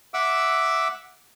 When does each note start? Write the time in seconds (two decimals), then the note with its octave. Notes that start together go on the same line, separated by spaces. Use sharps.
0.14 E5 F#5 D6 E6